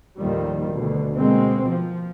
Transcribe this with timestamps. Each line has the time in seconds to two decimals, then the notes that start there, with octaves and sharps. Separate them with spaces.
0.17 D#2 A2 D#3 F3 G3
0.70 D2 B2
1.16 B2 G#3 A#3 C4
1.67 F3